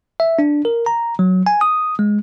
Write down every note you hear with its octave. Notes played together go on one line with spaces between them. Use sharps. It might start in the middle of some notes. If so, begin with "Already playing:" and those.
E5
D4
A#4
A#5
F#3
G#5
D#6
G#3